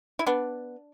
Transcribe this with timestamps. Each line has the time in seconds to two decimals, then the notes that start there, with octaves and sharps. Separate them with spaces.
0.19 E4
0.26 B3 D4